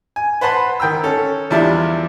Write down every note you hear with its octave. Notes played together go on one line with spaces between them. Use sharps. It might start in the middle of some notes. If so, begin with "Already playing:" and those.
G#5
B4 C5 F#5 A5 B5 C6
D#3 G5 A#5 E6
C#4 A4
E2 F3 G3 D4 E4